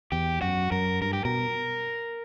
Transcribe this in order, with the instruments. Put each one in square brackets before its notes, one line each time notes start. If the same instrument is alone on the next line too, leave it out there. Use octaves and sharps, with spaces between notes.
[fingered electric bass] E2 [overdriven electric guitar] G4
[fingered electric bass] F#2 [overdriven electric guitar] F#4
[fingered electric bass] F#2 [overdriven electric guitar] A#4
[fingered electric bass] G2 [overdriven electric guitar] A#4
[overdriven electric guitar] G4
[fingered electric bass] B2 [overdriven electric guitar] A#4